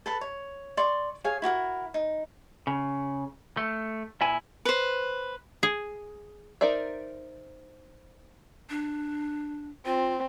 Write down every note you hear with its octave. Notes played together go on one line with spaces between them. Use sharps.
A4 B4 A5
C#5
D5 C6 C#6
G#4 C#5 F5 G#5
E4 F#4 G4 A#4
D#4
C#3
A3
A#2 E4 G#5
B4 C5
G#4
D#4 A#4 C5 D5 E5
D4
C4 F4